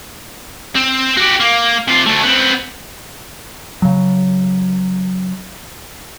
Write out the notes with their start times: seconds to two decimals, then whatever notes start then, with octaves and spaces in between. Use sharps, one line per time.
0.75 C4
1.17 F#4 G4
1.40 A#3
1.88 C3 F4
2.06 D2 A3
2.23 B3 C4
3.82 C#3 F#3